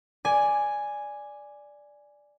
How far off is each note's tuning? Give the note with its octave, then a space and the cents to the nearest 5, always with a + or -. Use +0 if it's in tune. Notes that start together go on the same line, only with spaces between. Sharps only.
D5 +0 G#5 +0